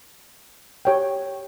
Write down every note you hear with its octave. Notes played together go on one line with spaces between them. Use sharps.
G4 C#5 G5